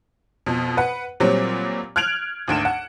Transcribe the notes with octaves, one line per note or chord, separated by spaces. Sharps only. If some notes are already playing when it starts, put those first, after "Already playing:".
F2 B2
B4 F#5
A#2 F#3 G3 C4
F6 F#6 G#6 D7 F7 F#7
G#1 D2 D7 E7
F#5